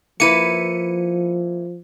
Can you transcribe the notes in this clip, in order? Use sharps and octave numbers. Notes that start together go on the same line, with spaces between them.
F3 A#3 E4 B4 C#7 D#7